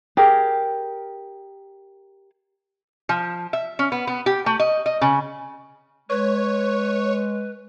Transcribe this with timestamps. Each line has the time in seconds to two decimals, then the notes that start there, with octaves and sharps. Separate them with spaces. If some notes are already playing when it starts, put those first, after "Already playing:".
0.17 G4 G#4 A#4
3.09 F3
3.53 E5
3.79 C#4
3.92 B3
4.07 B3
4.26 G4
4.46 A3
4.59 D#5
4.86 D#5
5.01 C#3
6.10 G#3 B4 C#5